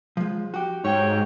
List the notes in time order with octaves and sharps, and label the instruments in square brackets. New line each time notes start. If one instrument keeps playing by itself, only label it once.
[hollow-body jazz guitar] F3 G#3
F#4 G4
[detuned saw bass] G#2 [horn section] C#5 G5